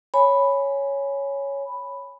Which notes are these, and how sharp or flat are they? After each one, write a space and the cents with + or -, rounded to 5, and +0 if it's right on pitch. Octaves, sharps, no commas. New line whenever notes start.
C#5 +0 G#5 +0 B5 +0